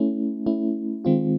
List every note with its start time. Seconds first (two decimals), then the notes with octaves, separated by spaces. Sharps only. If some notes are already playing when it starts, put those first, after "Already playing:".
Already playing: A3 C#4 E4
0.46 A3 C#4 E4
1.05 D#3 G#3 C4 F4